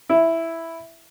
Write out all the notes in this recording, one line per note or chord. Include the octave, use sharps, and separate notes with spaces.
E4